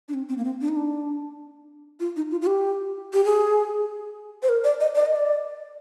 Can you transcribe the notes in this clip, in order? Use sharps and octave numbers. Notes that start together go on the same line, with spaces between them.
D4
C4
C4
A#3
C4
D4
D#4
D4
F4
D#4
F4
F4
G4
G4
G#4
C5
A#4
D5
D#5
D5
D#5
D5